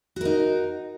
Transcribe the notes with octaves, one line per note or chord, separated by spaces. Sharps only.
D#4 F#4 A#4